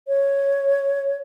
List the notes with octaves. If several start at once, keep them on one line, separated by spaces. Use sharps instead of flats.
C#5